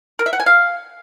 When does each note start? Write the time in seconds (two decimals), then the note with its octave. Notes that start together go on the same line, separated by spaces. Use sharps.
0.19 A#4
0.26 E5
0.33 F#5
0.40 G#5
0.46 F5